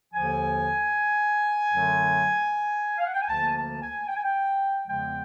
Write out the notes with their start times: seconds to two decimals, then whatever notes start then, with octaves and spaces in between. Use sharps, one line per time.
0.14 D#2 D3 F3 G#5
1.71 F#2 D3 F#3 A3
2.98 F5
3.06 F#5
3.13 G5
3.21 G#5
3.29 D2 D3 F3 A#3 A5
3.45 G#5
3.55 A5
3.81 G#5
4.07 G5
4.15 G#5
4.23 G5
4.86 E2 C#3 F3 G#3 B3 G5